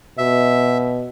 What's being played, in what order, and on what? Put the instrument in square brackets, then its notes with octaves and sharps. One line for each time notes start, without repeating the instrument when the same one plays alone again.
[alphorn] B2 [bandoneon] E5